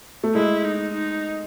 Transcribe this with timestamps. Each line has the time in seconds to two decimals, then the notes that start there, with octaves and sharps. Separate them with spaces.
0.24 A3
0.34 G#3 E4
0.65 D#4
0.94 D#4